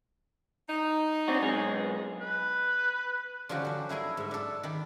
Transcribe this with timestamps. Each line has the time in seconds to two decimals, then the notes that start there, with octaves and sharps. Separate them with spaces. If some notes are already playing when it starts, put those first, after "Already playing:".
0.68 D#4
1.28 C4 D4 F#4
1.42 B1 G#3 G#4
2.21 B4
3.49 D3 F3 C#4 D#4 F#4 G4
3.65 F#3 D4
3.89 A3 E4 G#4 A#4
4.17 G#2 E5
4.31 D4 A4
4.63 D#3 D5 B5